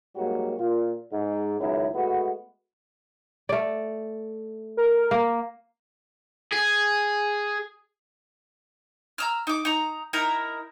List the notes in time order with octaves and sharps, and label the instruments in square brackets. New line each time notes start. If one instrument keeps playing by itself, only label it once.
[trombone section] G#2 F#3 G3 A#3 F#4
A#2 F4
G#2
G#1 C#2 F#2 D#4 E4
G#3 A3 B3 F#4
[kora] A3 D5
[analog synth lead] A#4
[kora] A#3
[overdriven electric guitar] G#4
[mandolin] A#5 E6 F6
D#4 D6
D#4 A#5
D#4 E4 A#4 A#5